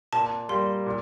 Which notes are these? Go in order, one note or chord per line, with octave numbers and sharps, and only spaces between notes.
A#2 A5
G3 A#3 C6
A#2